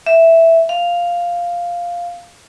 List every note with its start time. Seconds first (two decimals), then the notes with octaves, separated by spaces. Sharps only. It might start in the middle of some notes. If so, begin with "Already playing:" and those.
0.06 E5
0.69 F5